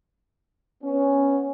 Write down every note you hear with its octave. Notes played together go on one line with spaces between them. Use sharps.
B3 C#4